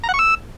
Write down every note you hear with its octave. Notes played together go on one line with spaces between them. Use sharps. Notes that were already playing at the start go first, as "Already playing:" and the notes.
A#5
F#5
C#6
E6